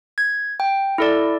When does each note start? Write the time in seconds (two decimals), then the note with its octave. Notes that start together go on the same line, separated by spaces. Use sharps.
0.18 G#6
0.60 G5
0.98 E4 A4 D5